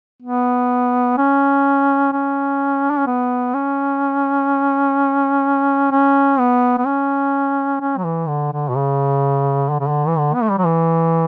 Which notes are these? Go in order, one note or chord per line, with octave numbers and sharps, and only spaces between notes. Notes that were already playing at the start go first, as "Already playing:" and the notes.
B3
C#4
C#4
D4
C#4
B3
C#4
C#4
B3
B3
C#4
C#4
F#3
E3
D3
D3
B2
C#3
D3
C#3
D3
E3
D3
B3
A3
G3
F#3
E3